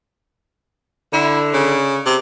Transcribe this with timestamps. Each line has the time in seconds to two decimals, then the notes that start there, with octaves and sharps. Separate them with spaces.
1.13 D3 E4
1.54 C#3
2.06 C3